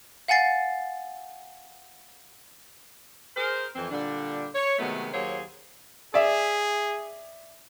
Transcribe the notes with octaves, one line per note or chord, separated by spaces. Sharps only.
F5 F#5 G#5 A6 C7
G#4 A#4 C5
F2 E3 C4
A#2 D3 G3 D4
C#5
C3 D#3 F#3 G#3 A3 B3
D#2 F#3 A#3 G#4 C5 C#5
G#4 D5 E5